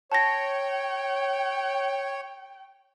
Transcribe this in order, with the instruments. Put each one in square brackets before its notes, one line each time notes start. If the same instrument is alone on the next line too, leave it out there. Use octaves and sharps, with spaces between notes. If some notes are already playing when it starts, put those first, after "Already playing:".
[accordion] C#5 [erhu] G5 [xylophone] A5 A#6